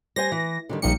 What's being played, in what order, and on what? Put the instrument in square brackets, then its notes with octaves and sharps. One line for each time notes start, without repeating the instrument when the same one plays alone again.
[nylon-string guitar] G3 C5 G#5 [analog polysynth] A#6
[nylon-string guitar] E3
D3 D#3 G3
[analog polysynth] A#1 C#7 [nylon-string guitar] G3 D#4 F4